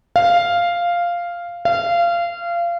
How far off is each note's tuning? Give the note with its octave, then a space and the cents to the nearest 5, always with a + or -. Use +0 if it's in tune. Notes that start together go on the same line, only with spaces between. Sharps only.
F5 -5
F5 -25